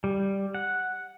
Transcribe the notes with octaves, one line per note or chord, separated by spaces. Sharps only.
G3
F#5